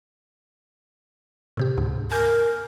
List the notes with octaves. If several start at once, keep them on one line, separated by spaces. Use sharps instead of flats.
A2 C3 G4
D2 G#2
A#4 G#5 F6 G6